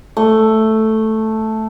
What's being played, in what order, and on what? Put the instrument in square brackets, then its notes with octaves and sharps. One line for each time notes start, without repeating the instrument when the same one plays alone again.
[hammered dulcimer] A3